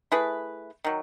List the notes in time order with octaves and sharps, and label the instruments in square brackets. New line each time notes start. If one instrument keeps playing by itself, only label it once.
[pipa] A3 E4 G#4 B4
D#3 F#3